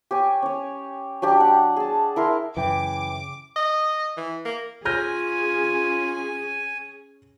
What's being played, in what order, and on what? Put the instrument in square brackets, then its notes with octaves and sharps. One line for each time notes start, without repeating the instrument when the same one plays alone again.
[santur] G4 C#5 G#5
C#4 C#5
F#3 D4 G4 G5
F#5
G#4 A5
E4 A#4 C6
[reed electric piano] F#2 G5 [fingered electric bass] C#3 [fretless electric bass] E3 [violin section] D6
[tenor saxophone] D#5
E3
A#3
[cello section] C#4 G#4 [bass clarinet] F4 [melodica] G#5 [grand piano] F6 G6 A#6